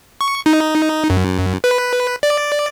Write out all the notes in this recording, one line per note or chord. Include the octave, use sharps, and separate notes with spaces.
C#6
D#4
F#2
B4
D5